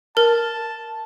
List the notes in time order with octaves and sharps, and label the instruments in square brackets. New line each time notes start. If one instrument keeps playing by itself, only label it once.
[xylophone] A#4 [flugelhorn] A5